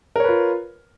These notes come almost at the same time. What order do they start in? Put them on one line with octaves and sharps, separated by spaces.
A#4 C#5 B4 F4